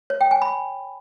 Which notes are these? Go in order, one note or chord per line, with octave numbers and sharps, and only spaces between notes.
C#5
G5
G#5
B5